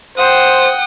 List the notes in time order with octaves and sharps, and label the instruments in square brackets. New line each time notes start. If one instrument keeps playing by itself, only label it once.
[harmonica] C5 [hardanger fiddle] F#5 G5 [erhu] D#6